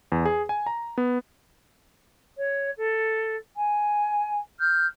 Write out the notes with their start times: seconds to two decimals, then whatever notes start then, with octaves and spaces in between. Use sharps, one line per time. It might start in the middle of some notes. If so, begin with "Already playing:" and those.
0.12 E2
0.26 G#4
0.49 G#5
0.67 A#5
0.98 B3
2.37 C#5
2.76 A4
3.56 G#5
4.60 F6 G6